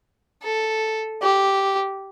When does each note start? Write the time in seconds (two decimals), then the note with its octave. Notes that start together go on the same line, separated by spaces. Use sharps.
0.43 A4
1.23 G4